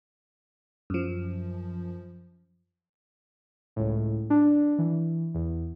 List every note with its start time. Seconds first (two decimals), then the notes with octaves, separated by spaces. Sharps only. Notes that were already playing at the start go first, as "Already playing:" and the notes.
0.90 F#2 F3
3.76 C#2 A2
4.30 D4
4.78 E3
5.34 E2